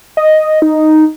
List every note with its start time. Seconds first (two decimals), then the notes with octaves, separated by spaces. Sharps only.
0.17 D#5
0.62 D#4